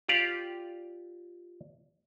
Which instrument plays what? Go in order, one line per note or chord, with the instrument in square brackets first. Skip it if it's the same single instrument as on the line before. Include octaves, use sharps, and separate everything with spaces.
[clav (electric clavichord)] F4 G4 D5 F5